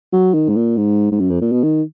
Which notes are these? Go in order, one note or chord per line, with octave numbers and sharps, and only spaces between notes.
F#3
D#3
G#2
A#2
G#2
G#2
F#2
F2
A#2
B2
D#3